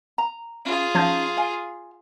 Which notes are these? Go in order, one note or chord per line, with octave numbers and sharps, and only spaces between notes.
A#5
C#4 F4 G#4
F3 C#4 D#4 F5 A5 G6
F5 G#5